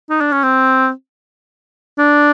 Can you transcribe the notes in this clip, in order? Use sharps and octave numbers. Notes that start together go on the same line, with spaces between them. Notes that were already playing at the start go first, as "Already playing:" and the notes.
D#4
D4
C#4
C4
D4